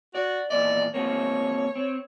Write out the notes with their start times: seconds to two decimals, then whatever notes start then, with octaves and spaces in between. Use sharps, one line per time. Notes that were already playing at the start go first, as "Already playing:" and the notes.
0.15 F#4 D5
0.50 E2 A#2 D5 D#5
0.94 A#3 C4 F#4 C#5
1.75 C4